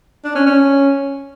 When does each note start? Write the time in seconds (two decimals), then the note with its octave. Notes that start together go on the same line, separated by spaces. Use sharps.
0.24 D4
0.35 C#4
0.46 C#4